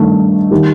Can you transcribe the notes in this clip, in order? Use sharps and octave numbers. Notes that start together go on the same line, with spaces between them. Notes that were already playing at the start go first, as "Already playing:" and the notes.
Already playing: G2 D#3 A3
D#3 G3